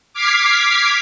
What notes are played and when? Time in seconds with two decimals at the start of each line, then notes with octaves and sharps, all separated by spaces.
0.13 D6 F6 G#6 B6 C7